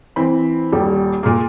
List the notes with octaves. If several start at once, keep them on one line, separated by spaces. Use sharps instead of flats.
E3 C4 B5
D#1 G3
A#2 G#3 A#3